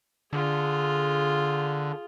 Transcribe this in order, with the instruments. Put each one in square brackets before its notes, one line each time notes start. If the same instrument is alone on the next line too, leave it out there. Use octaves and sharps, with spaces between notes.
[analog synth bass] D3 [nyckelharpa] F4 G#4